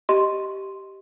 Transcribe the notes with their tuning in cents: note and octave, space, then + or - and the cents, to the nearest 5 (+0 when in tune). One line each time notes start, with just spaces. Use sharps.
G4 -10 D#5 +0 C6 +0